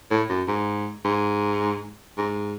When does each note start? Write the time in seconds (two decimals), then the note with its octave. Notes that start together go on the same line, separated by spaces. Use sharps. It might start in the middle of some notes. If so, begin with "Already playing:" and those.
0.11 A2
0.29 F#2
0.48 G#2
1.05 G#2
2.18 G#2